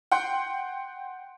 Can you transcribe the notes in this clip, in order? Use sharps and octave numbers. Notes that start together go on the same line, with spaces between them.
F#5 G5 C6